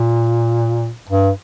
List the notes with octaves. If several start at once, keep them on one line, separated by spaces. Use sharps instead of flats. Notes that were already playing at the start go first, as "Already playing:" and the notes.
Already playing: A#2
G2